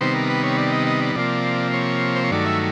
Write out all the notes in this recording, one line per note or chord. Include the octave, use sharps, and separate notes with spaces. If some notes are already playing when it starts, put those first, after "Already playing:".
C3 D#3 G3 B3 C5
A#4
B4
C#5
D5
D#5
D#5
D5
C3 F3 A#3 D5
C#5
C5
C#5
G2 D#3 F#3 A3 D5
E5